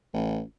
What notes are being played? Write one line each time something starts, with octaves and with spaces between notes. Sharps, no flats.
A1